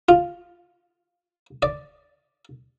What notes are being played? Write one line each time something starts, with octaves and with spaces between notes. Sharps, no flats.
F4
D5